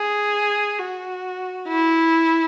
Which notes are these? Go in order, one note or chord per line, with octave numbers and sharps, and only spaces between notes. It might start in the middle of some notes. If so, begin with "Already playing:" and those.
Already playing: G#4
F#4
E4